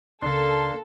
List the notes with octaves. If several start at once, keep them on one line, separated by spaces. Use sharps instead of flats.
C#2 C#3 A#3 D4 A4 C6